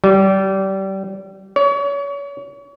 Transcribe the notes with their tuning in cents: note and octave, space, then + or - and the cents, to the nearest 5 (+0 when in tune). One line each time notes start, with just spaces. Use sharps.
G3 -25
C#5 +35